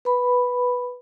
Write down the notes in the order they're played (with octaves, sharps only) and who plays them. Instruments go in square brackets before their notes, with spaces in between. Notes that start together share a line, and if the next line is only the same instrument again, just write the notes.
[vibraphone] B4 B5